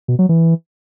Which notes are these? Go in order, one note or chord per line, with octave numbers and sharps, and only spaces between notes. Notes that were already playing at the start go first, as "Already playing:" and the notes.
B2
F#3
E3